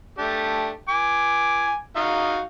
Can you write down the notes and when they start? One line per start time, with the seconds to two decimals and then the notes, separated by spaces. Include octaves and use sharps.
0.18 A3 D4 G4
0.89 G#5 D6
1.96 D#4 F#4 F5